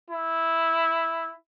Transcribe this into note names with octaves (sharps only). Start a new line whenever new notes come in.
E4